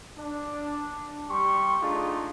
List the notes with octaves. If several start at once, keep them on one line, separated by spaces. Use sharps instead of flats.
D4
G3 G4 C6 C#6
A3 D4 D#4 F4 G#4